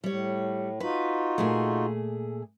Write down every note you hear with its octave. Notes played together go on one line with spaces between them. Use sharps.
A2 G3 C#5
D#4 F4 F#4 B4
A#2 A3 G#4